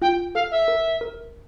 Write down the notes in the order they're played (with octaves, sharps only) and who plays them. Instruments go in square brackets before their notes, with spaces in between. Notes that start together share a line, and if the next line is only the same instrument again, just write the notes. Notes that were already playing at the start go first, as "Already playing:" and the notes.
[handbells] F4 [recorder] G5
[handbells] A4 [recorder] F5
[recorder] E5
[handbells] A#4
A#4